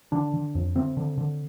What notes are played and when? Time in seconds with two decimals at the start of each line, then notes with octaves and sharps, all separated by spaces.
0.12 D3 D4
0.34 D3
0.55 F2
0.75 D3 C4
0.97 D3
1.18 D3